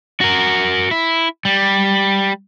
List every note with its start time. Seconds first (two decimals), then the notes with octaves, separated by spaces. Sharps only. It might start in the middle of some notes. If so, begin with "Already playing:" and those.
0.21 F#4 A#4
0.91 E4
1.45 G3